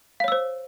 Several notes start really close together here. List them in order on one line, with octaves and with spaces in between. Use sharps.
F5 C#5 E6 C5